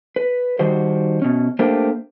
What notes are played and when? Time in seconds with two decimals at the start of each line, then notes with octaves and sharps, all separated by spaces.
0.16 B4
0.59 D#3 G3 F#4 C5
1.22 B2 C#4
1.59 A3 A#3 D4 G4 A#4 C5